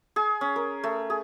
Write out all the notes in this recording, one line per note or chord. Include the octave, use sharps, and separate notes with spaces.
G#4
C#4
A#4
A3
G#4